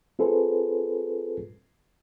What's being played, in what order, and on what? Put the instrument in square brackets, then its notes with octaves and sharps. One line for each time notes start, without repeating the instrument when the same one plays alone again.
[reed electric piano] C4 F4 G#4 A4 B4 C5